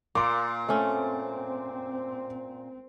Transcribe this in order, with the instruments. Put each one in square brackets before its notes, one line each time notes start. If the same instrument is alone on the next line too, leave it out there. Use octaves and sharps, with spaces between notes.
[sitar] A#2 [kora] A#3 [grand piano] C6 D6
[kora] A3 C#4 [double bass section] C4